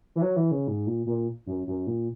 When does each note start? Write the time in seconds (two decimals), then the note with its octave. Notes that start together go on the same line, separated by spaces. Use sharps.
0.16 E3
0.22 F#3
0.36 E3
0.51 C#3
0.67 G#2
0.87 A#2
1.06 A#2
1.47 F#2
1.67 F#2
1.87 A#2